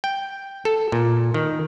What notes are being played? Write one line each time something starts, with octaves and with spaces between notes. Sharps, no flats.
G5
A4
A#2
D#3